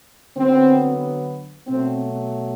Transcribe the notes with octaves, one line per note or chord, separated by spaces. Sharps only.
D3 F#3 B3 C4
B2 F#3 A3 C4